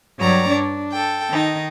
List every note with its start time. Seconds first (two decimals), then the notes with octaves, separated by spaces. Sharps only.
0.18 G2 F#3 C#5 D5 A#5
0.49 D4
0.92 A4 G5
1.30 D#3 D#4